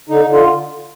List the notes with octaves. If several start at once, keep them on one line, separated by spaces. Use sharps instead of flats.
D3 D#4
D3
F4